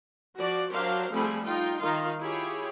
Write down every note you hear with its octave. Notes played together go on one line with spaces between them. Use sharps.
F3 F#4 D5
F#3 D4 G4 A#4 C5 F5
F3 G3 A3 C4 G#4 B5
D#4 F4 G5
D#3 D#4 F4 F5
E4 F4 G4 G#4 C#5